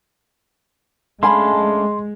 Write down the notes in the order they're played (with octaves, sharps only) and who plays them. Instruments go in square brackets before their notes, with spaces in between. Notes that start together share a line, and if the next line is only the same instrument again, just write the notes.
[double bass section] G#3 [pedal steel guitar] A3 C#4 D4 [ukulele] F5 G#5 B5 [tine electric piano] C6